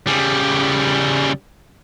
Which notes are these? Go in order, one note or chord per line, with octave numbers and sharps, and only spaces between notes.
C#3 G3